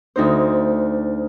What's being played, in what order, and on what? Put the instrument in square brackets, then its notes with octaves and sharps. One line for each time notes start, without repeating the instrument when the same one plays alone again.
[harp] D2 D#4 C5